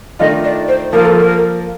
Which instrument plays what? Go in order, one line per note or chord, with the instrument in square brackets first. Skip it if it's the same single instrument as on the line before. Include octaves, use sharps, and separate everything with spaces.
[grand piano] D#3 A3 D4 F4 [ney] D#5
[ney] D5
C5
[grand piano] F3 A#3 F4 [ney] A#4
[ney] A4
A#4